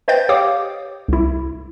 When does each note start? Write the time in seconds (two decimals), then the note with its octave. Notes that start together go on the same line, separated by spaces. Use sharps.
0.08 B4 C5 D#5 G5 G6 A6
0.29 G4 C#5 F5 G5 D6 D#6
1.08 C2 E4